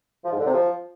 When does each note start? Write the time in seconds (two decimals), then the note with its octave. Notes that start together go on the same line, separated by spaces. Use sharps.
0.25 F3
0.32 G#2
0.39 D3
0.47 C3
0.54 F3